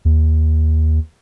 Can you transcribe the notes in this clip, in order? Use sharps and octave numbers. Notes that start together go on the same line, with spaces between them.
D#2